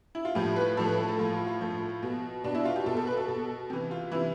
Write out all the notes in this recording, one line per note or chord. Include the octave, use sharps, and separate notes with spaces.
E4
F4
A2 F3 G4
B4
A2 F3 A4
B4
A4
A4
A2 F3 F4
F4
F4
A2 F3
B2
B2 D4
E4
F4
G4
B2 A4
A4
B4
A4
B2
C3 E3 G4
F4
C3 E3 E4